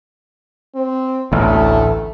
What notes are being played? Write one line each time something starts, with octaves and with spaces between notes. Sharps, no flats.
C4
A1 D2 A3